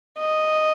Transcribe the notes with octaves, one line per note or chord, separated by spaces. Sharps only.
D#5